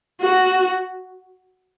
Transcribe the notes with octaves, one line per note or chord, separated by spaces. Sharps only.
F#4